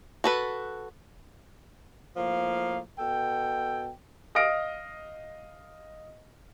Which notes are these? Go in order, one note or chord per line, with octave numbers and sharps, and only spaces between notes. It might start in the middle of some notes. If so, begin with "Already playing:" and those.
F#4 A4 B4
A2 F3 A#3 F5
B2 A4 G5
D#5 F5 D#6 F6 A#6 D7